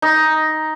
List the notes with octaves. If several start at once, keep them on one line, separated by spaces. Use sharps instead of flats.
D#4